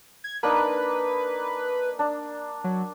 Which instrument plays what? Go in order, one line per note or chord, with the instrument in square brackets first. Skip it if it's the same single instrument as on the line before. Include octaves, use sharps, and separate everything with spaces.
[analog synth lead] G#6
[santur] A#3 D4 D#4 [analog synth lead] B4
[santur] D4
[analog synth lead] F#3